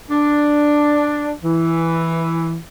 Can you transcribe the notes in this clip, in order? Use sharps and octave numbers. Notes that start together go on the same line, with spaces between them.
D4
E3